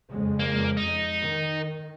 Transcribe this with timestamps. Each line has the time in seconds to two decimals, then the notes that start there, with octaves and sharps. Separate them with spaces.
0.10 F2 C#3 G#3
0.39 A#3
0.77 D#4
1.20 D#3